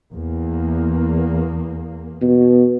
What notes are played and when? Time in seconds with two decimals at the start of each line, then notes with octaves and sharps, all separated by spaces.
0.13 E2 A#3
2.22 B2